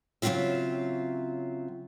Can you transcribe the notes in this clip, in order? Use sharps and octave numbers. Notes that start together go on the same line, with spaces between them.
C#3 F#3 G3 C4 F4 E5